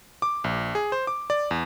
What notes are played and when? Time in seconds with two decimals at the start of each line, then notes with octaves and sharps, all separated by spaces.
0.22 D6
0.44 A#1
0.75 G#4
0.92 C5
1.07 D6
1.30 D5
1.51 E2